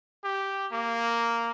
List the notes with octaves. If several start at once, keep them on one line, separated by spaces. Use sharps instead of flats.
G4
A#3